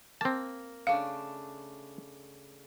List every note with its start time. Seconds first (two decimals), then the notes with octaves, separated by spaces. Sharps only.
0.21 A#3 C4 A5
0.87 C#3 A3 D4 F5